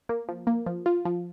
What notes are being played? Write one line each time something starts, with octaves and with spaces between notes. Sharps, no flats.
A#3
F3
A#3
F3
F4
F3